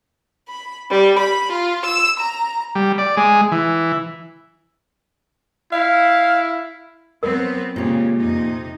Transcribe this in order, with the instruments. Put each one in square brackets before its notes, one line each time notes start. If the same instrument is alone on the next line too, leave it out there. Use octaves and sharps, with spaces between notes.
[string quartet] B5
G3
B5
F4
E6
A#5
[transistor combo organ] G3
D5
G#3
E3
[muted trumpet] E4 [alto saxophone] F5
[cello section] F#3 B3 C4 [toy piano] A#4
[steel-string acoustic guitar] A#2 G4 [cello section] C#3 G#3
[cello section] F2 C3 D#4